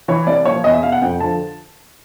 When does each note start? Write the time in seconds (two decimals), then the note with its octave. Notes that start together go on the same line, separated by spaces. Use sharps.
0.08 E3 C#5
0.27 C2 D5
0.45 A#2 C#5
0.49 F3
0.64 E2 D#5
0.73 E5
0.83 B2 F5
0.92 F#5
1.02 F2 G5
1.20 D3 F3 A5